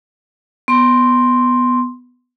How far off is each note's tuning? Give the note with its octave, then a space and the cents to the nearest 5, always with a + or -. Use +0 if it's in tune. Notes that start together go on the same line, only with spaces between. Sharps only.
B3 +0 C6 +5